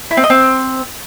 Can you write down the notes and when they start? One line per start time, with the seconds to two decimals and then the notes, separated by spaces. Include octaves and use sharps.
0.11 E4
0.17 C4
0.24 D#5
0.30 C4